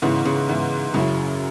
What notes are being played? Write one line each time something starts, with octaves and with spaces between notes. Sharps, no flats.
G#2 C#3 E3 B3 E4
C#3
G#2 E3 B3 E4
F#2 C#3 F#3 E4